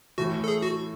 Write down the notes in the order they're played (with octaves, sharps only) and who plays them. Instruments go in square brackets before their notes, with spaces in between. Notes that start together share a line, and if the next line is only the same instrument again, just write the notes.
[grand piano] A2 E3 A3 [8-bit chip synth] F#4
[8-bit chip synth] A4
G#4
F#4